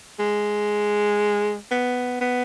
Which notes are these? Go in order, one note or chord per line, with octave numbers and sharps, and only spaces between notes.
G#3
B3
B3